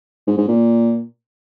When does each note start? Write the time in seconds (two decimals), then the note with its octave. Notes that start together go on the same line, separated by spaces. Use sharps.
0.27 G#2
0.38 G#2
0.48 A#2